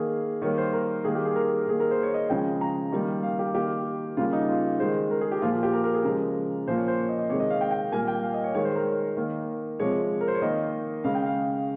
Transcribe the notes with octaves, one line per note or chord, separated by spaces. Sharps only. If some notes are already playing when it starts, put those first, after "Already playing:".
Already playing: D#3 A#3 G#4
D#3 G3 A#3 C#5
C5
A#4
D#3 G3 A#3 G#4
G4
G#4
A#4
D#3 A#3 G#4
A#4
C5
C#5
D#5
C#3 F3 G#3 G5
A#5
D#3 G3 A#3
F5
G4
D#3 A#3 G4
C#3 G3 A#3 F4
D#4
F4
D#3 G#3 C5
A#4
G#4
G4
A#2 F3 A#3 F4
F4
G4
A#4
A#4
G#4
C#3 F3 G#3 A#4
A#2 F3 A#3 C5
C#5
C5
C#5
D#5
D#5
C3 D#3 G#3 C#5
D#5
F5
G5
G5
A#2 G3 A#3 G#5
G5
F5
D#5
C#5
D#3 G#3 C#5
C5
A#4
C#5
D#3 A#3
C3 F3 G#3 C#5
A#4
C5
C#5
D#3 A#3 D#5
C#3 G#3 F5
G5
F5